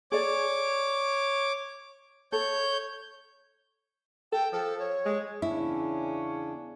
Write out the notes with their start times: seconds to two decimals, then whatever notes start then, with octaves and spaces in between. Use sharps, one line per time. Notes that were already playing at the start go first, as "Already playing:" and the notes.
0.12 G#4 A4 C#5 D5 D6
2.32 A4 C#5 G6
4.33 A4 G5
4.53 F3 A4
4.79 C#5
5.06 G#3
5.42 E2 C#3 C#4 D4 E4